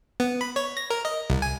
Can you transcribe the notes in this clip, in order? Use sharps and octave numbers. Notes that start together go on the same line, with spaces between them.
B3
B5
C#5
A#6
A#4
D#5
C2
G#5